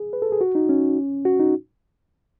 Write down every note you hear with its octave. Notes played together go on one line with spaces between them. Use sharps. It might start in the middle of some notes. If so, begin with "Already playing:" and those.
Already playing: G#4
B4
A4
G#4
F#4
D#4
C#4
F#4
D#4